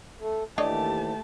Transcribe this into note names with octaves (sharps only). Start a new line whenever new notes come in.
A3
D#2 E3 A3 D4 G4 C#5 D#5 A5